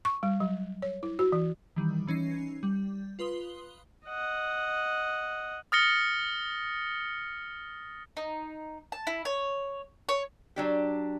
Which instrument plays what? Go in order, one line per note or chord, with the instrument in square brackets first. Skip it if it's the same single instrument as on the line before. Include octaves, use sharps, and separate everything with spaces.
[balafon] C#6
G3
F#3
C#5
E4
F#4
E3
[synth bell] D#3 E3 G3
E3 C#4 D#4 C7
G3
F4 B4 C6 D#6 G7
[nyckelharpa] D#5 F#5
[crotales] D#6 F6 A6 A#6 C#7 G7
[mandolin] D#4
A5
E4
C#5
C#5
[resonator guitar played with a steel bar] F#3 D4 G4